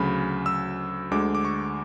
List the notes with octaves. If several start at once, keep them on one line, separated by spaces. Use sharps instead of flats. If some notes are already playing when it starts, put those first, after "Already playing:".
Already playing: D2 C#3 F#3 B5
E6
D2 D3 G#3 D6
D6
C#6